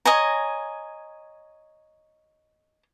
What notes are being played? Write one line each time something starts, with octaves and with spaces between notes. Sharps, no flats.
C#5 D#5 G#5 A#5